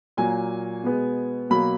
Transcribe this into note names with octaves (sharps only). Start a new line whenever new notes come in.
A#2 F#3 A#3 G#5
B2 G#3 B3
B2 F#3 A#3 B5